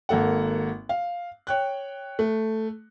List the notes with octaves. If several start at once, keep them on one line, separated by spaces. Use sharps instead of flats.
G#1 A#3 A4 F#5
F5
C#5 G5 F#6
A3